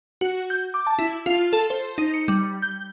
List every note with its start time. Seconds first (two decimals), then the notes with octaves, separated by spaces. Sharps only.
0.21 F#4
0.50 G6
0.74 D6
0.87 A5
0.99 E4
1.26 F4
1.53 A4
1.70 C5
1.98 D#4
2.14 C#7
2.28 G3
2.62 G6